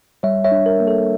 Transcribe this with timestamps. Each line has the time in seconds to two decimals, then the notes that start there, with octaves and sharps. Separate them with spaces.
0.23 G3 C#5 E5
0.44 C#5 E5
0.52 D4
0.66 A#4
0.80 A#3
0.87 A4